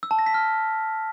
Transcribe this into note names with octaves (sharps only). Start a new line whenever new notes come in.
E6
A5
A#6
B6
F6